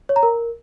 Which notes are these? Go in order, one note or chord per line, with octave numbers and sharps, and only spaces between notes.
C#5
A#5
A#4